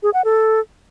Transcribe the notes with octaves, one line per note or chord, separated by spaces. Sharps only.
G#4
F#5
A4